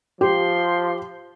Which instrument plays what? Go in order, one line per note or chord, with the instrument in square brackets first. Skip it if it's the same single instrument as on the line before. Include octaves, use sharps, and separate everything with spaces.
[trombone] F3 [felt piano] G4 [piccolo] C6